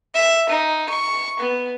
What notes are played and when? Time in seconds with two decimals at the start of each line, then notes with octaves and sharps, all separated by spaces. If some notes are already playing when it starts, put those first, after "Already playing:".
0.15 E5
0.50 D#4
0.89 C#6
1.40 B3